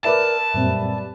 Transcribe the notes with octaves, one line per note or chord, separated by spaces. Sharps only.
A#4 B4 D5 E5 A5
F#2 A#2 G3 C4